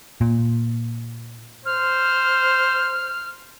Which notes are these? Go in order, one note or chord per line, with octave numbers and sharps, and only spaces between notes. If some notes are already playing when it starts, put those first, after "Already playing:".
A#2
C5 F6